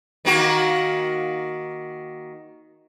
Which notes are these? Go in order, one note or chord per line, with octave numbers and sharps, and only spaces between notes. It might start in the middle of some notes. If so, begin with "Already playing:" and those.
D#3 A#3 F#4